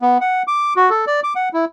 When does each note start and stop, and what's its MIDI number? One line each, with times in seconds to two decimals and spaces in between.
0.02 0.18 59
0.21 0.43 78
0.47 0.74 86
0.76 0.90 66
0.90 1.05 69
1.07 1.20 74
1.23 1.34 86
1.36 1.49 78
1.53 1.65 64